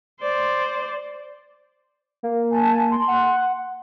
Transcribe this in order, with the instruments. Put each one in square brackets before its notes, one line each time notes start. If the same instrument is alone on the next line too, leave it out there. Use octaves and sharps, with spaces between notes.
[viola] C5 D5
[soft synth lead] A#3
[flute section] G#5 A5
C6
[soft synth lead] F#5